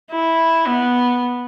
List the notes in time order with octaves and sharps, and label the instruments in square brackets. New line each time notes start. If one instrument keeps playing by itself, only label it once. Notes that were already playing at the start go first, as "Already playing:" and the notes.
[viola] E4
B3